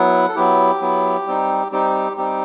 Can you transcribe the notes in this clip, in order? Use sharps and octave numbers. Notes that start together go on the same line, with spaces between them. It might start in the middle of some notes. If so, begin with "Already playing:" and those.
Already playing: F#3 B3 E4 F#5
A4
F#3 B3 E4 G4
F#3 B3 E4
G3 C4 D#4
G3 C4 D#4 G4
G3 C4 D#4 G4